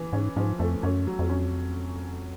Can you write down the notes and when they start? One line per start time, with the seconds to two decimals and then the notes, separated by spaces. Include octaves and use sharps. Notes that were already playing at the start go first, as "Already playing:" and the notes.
Already playing: E3
0.13 G#2 C#4
0.36 G#2 F3
0.59 F2 A3
0.83 F#2 C#4
1.07 F#3
1.19 F2
1.30 C#4